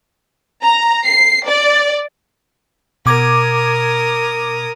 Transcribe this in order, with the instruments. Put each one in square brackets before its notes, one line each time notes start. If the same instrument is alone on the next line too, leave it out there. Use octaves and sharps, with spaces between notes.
[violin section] A#5
C7
D5
[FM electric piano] B2 D6 G#6 [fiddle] A#4 D#6